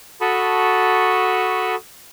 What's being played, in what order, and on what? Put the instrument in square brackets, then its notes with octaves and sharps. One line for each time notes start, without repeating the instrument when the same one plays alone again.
[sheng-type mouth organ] F#4 A4 A5 B5 C#6 D#6